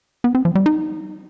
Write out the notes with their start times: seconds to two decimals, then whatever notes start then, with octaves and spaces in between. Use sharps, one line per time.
0.24 B3
0.35 C4
0.45 F3
0.55 G3
0.66 D#4